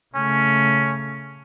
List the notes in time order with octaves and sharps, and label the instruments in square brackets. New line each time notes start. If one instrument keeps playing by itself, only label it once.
[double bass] C#3 A3 [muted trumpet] C#4